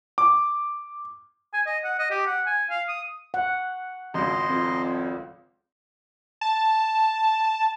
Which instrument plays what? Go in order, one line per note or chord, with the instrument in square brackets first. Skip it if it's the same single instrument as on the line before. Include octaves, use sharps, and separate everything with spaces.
[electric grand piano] D6
[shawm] G#5
D#5
F#5
D#5
G4
F#5
G#5
F5
D#6
[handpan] F#5
[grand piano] G#1 C#2 [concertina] D#5 C6
[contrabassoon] F2
[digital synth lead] A5